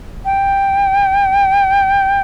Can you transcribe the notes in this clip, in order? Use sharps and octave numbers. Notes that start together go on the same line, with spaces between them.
G5